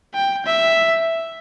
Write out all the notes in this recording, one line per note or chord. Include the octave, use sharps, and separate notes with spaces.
G5
E5